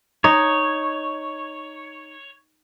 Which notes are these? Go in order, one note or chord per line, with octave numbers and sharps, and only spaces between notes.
D#4 C#5